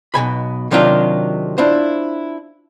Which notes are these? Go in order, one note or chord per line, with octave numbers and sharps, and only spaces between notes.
B1 B2 G#5 B5
C3 D#3 F#3 D4 F4
D4 E4 F4 C5